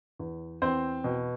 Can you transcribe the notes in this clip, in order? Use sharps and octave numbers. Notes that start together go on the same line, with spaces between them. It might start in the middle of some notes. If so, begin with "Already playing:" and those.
E2
E2 C4 C5
B2